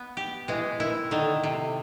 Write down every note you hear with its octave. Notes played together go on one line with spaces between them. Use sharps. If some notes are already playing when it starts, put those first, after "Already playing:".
Already playing: B3
G4
E3 G#3
D#3 E4
D3 D#3
C3